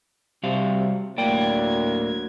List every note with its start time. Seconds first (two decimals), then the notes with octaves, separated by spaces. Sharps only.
0.43 C3 G3 F#4 F5
1.18 D2 A2 F#3 A#3 D5 G5 G#6